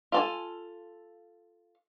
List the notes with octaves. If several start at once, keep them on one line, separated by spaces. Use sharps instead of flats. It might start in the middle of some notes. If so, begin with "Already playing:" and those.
F4 A4 G#5